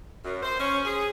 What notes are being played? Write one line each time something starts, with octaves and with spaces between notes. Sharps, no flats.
F#2
C5
C#4
G#4